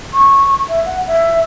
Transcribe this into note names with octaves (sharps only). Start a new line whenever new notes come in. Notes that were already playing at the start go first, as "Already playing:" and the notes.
C#6
E5
F#5
E5